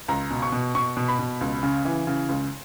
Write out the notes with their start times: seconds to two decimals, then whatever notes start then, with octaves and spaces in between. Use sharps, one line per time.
0.08 C#2 A#5
0.31 B2
0.42 C#6
0.52 B2
0.75 B2 C#6
0.97 B2
1.08 B5
1.19 B2
1.41 C#2
1.63 C#3
1.85 E3
2.07 C#3
2.29 C#2